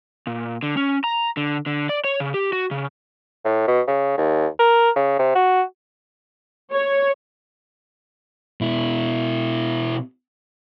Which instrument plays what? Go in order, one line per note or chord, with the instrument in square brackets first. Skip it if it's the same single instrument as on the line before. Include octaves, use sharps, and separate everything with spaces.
[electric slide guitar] A#2
D3
C#4
A#5
D3
D3
D5
C#5
C#3
G4
F#4
C#3
[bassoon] A2
B2
C#3
D#2
A#4
C#3
C3
F#4
[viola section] C#5
[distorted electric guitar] B2 E4